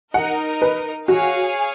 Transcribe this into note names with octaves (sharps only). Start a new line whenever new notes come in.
D#4 A#4 D#5 F#5
B4
F#4 G#4 C#5 F5 G#5